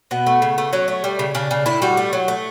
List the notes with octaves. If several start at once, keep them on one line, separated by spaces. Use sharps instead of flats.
B2 B3
A3
C#3
A3
F#3 C#4
A3
G3
C#3
C#3 D4
C#3
A2 E4
G3 F#4
A3
F#3
A3